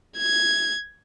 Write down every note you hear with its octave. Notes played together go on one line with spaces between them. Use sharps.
G#6